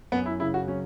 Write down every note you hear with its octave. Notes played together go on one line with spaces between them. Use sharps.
F#2 B3
E4
C#3 E4
F#4
F#3 C#4